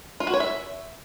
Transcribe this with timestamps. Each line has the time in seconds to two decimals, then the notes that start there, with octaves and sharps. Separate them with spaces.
0.20 F4
0.27 F#4
0.34 C#5
0.40 E5